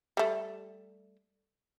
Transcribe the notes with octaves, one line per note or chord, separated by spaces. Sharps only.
G3 A3